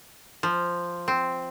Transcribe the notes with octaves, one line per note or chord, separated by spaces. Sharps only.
F3
C4